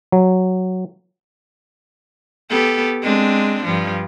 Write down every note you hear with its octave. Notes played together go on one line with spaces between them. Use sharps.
F#3
B3 G4 A4
G#3 C4 D4
G2 F3